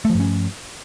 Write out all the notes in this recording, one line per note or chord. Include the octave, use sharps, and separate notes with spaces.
G2 F3 A3 C#4